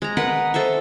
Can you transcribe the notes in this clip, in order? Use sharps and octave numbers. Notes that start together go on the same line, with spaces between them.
G#3 A#5
A#4 B4 D#5 F#5
A4 C5 E5 C#6